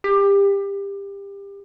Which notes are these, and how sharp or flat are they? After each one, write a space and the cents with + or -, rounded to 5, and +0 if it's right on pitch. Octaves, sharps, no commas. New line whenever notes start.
G4 +25